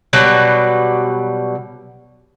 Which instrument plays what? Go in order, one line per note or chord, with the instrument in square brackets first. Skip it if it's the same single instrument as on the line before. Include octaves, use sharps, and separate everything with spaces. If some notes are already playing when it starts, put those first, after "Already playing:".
[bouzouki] B2 F#3 G3